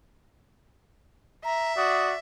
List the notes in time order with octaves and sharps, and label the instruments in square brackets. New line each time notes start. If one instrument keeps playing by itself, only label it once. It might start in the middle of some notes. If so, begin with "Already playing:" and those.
[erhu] E5 [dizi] A#5
[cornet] F#4 [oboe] D5 [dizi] D#6